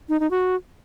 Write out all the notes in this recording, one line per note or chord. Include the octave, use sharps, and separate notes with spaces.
D#4
D#4
F#4